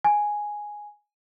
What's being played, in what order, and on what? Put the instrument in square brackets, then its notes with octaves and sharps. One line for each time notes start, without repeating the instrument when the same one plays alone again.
[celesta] G#5